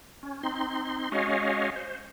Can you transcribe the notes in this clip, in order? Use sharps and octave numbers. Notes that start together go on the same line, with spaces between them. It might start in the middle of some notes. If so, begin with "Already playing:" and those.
C#4
C4 D#4 C6
G#3 C#4 F#4 C#5 D#5 F5
C5